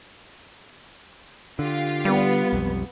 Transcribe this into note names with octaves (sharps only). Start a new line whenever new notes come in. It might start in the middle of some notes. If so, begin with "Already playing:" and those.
D3 F4 G4 F5
G3 B3
B1 F2